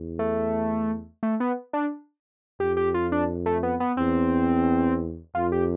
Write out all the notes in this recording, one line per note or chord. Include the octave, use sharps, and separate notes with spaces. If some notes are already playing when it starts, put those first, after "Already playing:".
Already playing: E2
A3
A3
B3
D4
F2 G4
G4
F4
D4
A3
B3
B3
E2 C4
F2 F4
G4